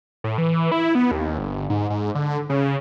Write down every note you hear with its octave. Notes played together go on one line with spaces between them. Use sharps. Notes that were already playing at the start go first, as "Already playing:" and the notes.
A2
E3
E4
B3
D#2
G1
G#2
G#2
D3
C#3